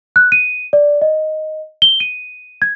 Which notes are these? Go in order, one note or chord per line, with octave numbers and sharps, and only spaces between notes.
F#6
D#7
D5
D#5
G7
D#7
G#6